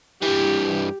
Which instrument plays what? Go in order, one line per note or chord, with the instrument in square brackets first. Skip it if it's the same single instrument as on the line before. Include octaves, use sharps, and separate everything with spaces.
[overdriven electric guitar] G2 E3 [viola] G4